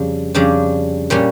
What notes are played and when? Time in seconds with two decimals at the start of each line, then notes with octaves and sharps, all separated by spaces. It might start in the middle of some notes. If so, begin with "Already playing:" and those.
Already playing: F2 C#3 G3 D4
0.34 F2 C#3 G3 D4
1.10 A#2 G3 C#4